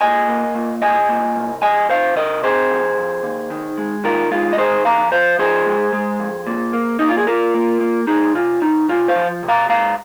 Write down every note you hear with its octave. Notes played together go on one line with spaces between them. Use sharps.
A#2 D#5 G#5
A#3
A#2
C2 D#5 G#5
A#2
C2
F2 D#5 G#5
C3 C5 F5
C3 A#4 D#5
C4 G#4 C5
F2
F2
D#2
D#3
G#3
D#3 F4 A#4
G#3 F4
D#5
D#3 G#4 C5
F2 F5 A#5
F3 C5 F5
F3 G#4 C5
G#3
G#3
F2
A#2
A#3
A#3 D#4
F4
G#4
A#2 F4 A#4
A#3
A#3
C2 D#4 G#4
C3 F4
C3 D#4
C3 F4
C5 F5
F3
C3
F5 A#5
G#2 F5 A#5